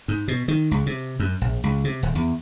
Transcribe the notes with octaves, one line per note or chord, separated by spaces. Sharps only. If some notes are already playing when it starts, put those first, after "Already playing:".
G#2
B2
D#3
C#2
C3
F#2
A#1
C#2
C3
D#1
E2